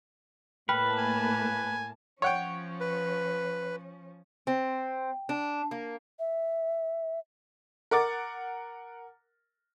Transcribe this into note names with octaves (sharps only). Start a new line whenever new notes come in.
A2 A#3 B4 G5 A5 B5 F6
G#5
F3 C#4 C#5 F#5 G5
B4
C4
D4
A#3
E5
A#4 F#5 D6 A6